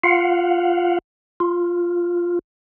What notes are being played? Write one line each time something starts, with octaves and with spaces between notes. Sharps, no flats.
F4 F5 F#5
F4